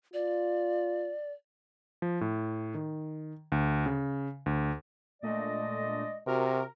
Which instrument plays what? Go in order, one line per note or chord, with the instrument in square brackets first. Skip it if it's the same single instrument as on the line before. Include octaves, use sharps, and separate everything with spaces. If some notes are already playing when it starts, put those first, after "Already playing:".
[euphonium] F4 [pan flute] D5
[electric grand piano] F3
A2
D#3
D2
C#3
D2
[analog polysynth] A#2 A3 D4 [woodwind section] G#3 D5 D#5
[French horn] C3 [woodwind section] F#4 [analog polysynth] A#4